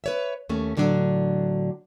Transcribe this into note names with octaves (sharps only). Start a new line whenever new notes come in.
B4 C#5 E5
D#2 A3 C#4
A2 D3 F#3 D4